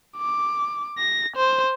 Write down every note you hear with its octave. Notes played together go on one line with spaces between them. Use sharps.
D6
A#6
C5